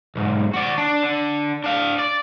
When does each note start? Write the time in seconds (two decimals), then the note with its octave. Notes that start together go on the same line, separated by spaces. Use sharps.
0.15 B1 G#2
0.54 F#4 D5
0.78 D4
1.03 D3
1.64 D4 F5
1.99 D5